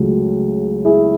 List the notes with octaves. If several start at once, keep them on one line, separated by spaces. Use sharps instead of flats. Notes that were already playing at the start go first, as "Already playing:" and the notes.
Already playing: C#2 C#3 F#3 A3
E4 G#4